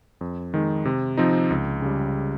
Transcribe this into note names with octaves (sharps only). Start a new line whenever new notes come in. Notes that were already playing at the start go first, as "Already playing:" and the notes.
F2
D#3 G#3 D#4
C3
F3 C4 D#4
C#2
C#3 G3